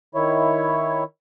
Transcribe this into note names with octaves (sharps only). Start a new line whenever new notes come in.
D#3 E4 C#5